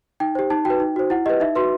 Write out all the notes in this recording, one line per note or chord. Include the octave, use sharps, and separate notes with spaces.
D#4 G5
G4 C5
D#4 A5
F#4 B4 G5
D#4
F#4 C5
E4 F#5
G4 B4 D#5
D#4 E5
F#4 B4 C6